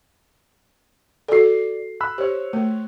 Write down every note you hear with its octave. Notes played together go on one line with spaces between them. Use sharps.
F#4 A4 D5 C7
B5 E6 F#6
G4 C5 C#5
A3